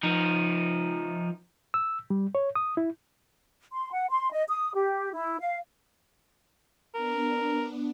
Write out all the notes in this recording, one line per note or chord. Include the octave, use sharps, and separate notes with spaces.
F3 D#4
E6
G3
C#5
D#6
E4
C6
F#5
C6
D#5
D#6
G4
E4
F5
B3 D4 A#4